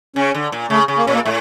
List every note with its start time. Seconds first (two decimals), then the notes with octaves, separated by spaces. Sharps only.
0.16 C#3 C#4
0.34 D3
0.52 A#2
0.70 C#3 A3
0.88 C#3
0.97 A#3
1.06 A#2 C#4
1.14 A#3
1.25 A2 A3